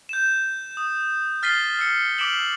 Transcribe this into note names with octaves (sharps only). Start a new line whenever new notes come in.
G6 E7
D#6
F6 A6 B6 C7 D#7 G7
E6 C#7
D6 B6 D7 E7 F#7